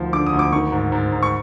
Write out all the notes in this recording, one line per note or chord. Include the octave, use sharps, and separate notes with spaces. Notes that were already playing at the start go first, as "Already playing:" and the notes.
Already playing: D2 D#3 F3
D3 D6
D#6
D2
D6
D#3 C#6
G#2
G#2
G#2
C#6